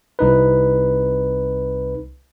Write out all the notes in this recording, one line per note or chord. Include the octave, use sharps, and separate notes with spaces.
C2 D#4 B4